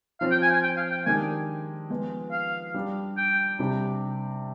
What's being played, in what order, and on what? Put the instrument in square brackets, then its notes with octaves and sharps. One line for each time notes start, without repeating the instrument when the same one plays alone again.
[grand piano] F3 C4 F4 [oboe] F5
[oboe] G5
G#5
G#5
G5
F5
G5
[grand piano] D#3 G#3 D4 G4 [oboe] G#5
[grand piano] F3 G#3 B3 F4
[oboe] F5
[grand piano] G3 D4 G4
[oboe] G5
[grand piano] C3 G3 D4 G4